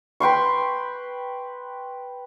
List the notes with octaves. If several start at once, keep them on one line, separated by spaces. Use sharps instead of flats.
B4 G5 C6 C#6